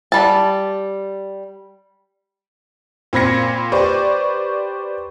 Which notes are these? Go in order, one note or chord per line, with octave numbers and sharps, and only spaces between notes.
G3 A5
A#2 C4 B5 G#6 A#6 C#7
G4 B4 C5 D5 C#6